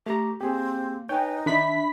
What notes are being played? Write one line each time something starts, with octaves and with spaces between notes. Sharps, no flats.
A3 G4 A#5
A#3 C4 G4 G#4
D#4 B4 C#5 G5 G#5
D#3 D4 E5 B5 B6